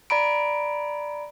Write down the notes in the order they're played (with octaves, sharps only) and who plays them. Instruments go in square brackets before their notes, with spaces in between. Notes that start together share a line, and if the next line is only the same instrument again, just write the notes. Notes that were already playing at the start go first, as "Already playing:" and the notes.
[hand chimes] D5 A#5 B5 D7